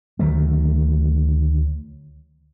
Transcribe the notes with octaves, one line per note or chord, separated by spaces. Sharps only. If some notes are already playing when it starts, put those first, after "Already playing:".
D2 D#3 F#3 A3